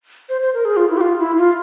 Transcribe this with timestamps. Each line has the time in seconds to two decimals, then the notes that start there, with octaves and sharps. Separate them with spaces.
0.29 C5
0.42 C5
0.54 A#4
0.65 G#4
0.77 F4
0.90 E4
0.97 G4
1.01 F4
1.19 E4
1.37 F4